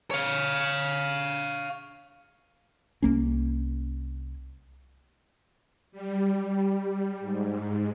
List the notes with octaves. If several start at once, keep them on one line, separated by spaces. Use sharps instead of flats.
C#5 F5
C2 A#3 C#4
G3
G#2